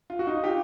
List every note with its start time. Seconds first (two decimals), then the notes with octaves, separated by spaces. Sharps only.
0.10 F4
0.19 F#4
0.27 D#4 F4
0.44 F4 G4